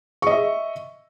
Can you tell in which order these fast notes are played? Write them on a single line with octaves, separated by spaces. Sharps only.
C#6 D#5 E5